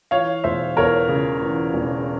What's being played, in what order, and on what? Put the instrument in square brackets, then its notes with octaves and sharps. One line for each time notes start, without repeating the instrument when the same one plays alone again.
[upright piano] E3 C#5 F5
E1 C5 E5
E2 A#4 C#5
C#3
E3
E1